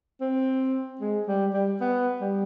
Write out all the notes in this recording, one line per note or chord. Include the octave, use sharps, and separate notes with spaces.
C4
G#3
G3
G3
B3
G3